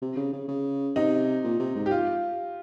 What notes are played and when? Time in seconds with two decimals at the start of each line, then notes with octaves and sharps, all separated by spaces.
0.02 C3
0.16 C#3
0.33 C#3
0.48 C#3
0.96 C3 D#4
1.44 A#2
1.59 C3
1.75 G#2
1.86 G4
1.91 F4